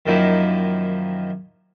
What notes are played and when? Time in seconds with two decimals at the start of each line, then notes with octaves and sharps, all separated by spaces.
0.06 F#2 D#3 F3 A#3 D#4 E4